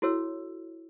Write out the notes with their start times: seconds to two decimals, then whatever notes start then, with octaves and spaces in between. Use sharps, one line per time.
0.02 E4 F#4 A4 C#5 E6